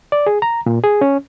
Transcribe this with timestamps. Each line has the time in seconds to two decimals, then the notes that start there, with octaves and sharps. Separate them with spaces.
0.12 D5
0.27 G#4
0.42 A#5
0.66 A#2
0.84 G#4
1.01 C#4